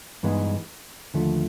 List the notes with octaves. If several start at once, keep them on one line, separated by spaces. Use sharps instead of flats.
G2 E3 G#3 B3 D#4
D#2 D3 F3 A3